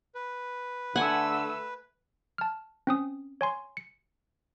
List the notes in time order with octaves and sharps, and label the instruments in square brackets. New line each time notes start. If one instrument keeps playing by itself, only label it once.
[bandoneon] B4
[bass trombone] D3 [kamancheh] A3 E6 [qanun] F#5 G#5
[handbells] A5 F6
C4 C#4 D#6
C#5 G#5 C6
C#7